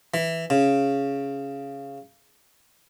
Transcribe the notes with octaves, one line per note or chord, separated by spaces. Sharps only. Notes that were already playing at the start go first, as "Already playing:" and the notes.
E3
C#3